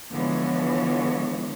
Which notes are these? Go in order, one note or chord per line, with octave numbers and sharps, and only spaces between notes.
D3 E3 F3 G#3 B3 C#5